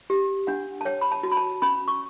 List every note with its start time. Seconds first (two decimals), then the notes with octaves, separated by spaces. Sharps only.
0.10 G4
0.47 D4 F#5
0.81 A5
0.85 C#5 G5
1.01 B5
1.12 A5
1.23 F#4
1.32 B5
1.37 A5
1.62 C#4 B5
1.88 C#6